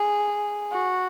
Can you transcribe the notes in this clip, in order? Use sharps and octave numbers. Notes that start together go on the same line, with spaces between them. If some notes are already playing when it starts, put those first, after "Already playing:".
Already playing: G#4
F#4